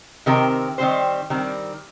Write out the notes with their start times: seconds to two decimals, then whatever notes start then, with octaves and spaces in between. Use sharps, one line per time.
0.26 C3 D#3 C4 G4 A#4
0.78 D#3 G3 C4 G4 C5
1.30 D#3 G3 C4